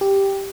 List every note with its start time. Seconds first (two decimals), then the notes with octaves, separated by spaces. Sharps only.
0.01 G4